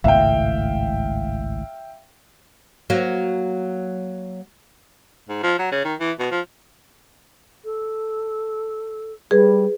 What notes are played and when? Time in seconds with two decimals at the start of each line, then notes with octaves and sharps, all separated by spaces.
0.04 G#1 C#2 A2 E5 F5 G5
2.90 F#3 A#3
5.29 G#2
5.43 F3
5.59 F#3
5.72 C#3
5.85 D#3
6.00 E3
6.19 B2
6.31 F3
7.65 A4
9.31 G3 G#4 B4